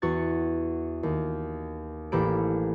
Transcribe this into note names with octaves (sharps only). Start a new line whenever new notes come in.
E2 F#4 C#6 A6
D#2
A1 A#3 G4 A4 B5 D7